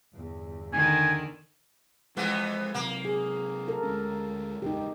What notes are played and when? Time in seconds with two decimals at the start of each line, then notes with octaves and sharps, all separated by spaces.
0.13 G1 E2
0.73 D3 D#3 G#5
2.17 F2 E3 G#3 B3
2.74 C3 F#3 A#3
3.05 G#4
3.68 A4 A#4
3.83 D2 G#3 C#4
4.62 F#1 E2 G#2 D#4 G4